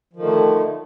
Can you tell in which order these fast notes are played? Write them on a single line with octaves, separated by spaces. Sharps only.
F3 D#3 D3 A3